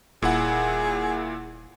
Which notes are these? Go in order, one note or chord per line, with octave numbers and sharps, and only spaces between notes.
D#1 A#2 E4 G#4 F#5